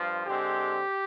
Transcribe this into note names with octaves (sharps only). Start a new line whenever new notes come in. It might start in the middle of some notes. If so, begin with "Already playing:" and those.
Already playing: G2 F3 F4
D3 G#3 C4 G4